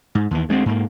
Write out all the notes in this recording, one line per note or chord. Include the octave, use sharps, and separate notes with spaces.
G#2
D#2 E3
D2 G#3 A3 C4
G#2 A#3